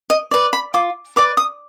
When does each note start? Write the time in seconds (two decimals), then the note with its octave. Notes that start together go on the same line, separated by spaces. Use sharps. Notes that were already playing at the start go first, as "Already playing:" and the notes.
0.10 D#5
0.31 B4 D5
0.53 B5
0.74 F4 D6
1.16 B4 D5 D6
1.37 D#6